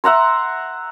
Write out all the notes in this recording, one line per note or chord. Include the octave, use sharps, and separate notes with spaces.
E5 F#5 A#5 C6